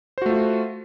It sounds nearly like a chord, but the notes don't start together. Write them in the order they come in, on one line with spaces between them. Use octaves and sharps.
C5 F#4 A3 F4